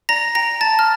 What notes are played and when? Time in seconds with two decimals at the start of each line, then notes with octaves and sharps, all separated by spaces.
0.09 D5 A#5 A#6
0.35 G5 A#5 A#6
0.61 D5 A5 A6
0.79 F6